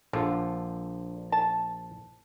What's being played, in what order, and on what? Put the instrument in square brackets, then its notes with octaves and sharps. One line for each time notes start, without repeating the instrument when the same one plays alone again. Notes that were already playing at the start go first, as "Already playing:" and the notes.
[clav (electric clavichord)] A#1 F4 [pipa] D3
[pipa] A5